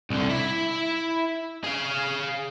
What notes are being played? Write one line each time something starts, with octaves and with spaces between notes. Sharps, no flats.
C2 D3
E4 E5
G#4 F5